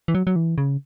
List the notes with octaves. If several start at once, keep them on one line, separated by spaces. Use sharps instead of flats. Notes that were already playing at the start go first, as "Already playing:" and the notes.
E3
F#3
F#3
E3
C#3